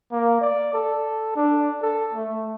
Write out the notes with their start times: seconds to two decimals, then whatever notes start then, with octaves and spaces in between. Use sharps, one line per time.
0.12 A#3
0.41 D5
0.73 A4
1.36 D4
1.82 A4
2.14 A3